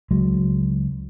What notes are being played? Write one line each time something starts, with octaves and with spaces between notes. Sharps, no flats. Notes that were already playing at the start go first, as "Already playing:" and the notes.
C#2 F#3 G#3